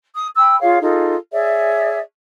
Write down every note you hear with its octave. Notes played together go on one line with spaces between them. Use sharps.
D#6
G5 B5 E6
F4 G#4 C#5 F5
D#4 F4 G#4 A4
G#4 C#5 D5 E5